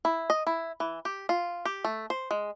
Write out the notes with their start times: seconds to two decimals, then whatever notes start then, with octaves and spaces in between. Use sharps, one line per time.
0.05 E4
0.30 D#5
0.47 E4
0.80 E3
1.05 G4
1.29 F4
1.65 G4
1.85 A3
2.10 C5
2.31 G#3